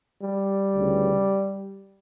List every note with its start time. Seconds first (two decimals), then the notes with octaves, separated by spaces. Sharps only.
0.24 G3
0.74 D2 C#3 E3